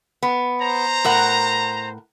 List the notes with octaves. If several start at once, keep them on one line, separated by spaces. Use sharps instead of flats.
B3
C5 A#5
A2 A#4 F#5